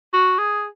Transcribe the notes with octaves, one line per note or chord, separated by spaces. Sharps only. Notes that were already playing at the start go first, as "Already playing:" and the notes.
F#4
G#4